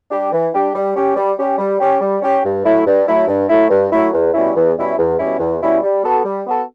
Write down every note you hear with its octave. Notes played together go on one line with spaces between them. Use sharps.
G3 D4 G4
E3
G3 D4 G4
G3
C#4 G4
G3
C#4 G4
G3
C#4 G4
G3
C#4 G4
G2
F#3 A3 E4
G2
F#3 A3 E4
G2
F#3 A3 E4
G2
F#3 A3 E4
E2
B2 G3 C#4 E4
E2
B2 G3 C#4 E4
E2
B2 G3 C#4 E4
E2
B2 G3 C#4 E4
G3
B3 F#4 A4
G3
B3 F#4 A4